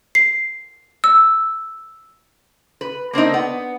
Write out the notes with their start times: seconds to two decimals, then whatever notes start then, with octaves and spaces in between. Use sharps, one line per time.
0.15 C7
1.04 E6
2.81 B4
3.13 A#3 C4 D4 D#4
3.34 B3